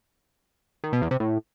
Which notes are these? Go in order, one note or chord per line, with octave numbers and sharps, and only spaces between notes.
D#3
B2
E2
C3
A2